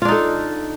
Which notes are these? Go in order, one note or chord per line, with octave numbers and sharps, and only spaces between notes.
D4 D#4 F4 A4